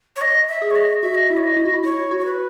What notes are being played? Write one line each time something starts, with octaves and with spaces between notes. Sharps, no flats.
C#5
D#5
E5
G#4
C#5
D#5
F#4 E5
D#5
E4 E5
C#5
D#5
E4
F#4
E4
E4 C#5
F#4
C#5
B4